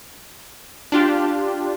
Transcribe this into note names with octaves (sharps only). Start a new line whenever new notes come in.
D4 F4 G4